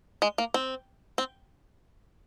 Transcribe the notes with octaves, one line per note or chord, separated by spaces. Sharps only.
G#3
A#3
C4
C4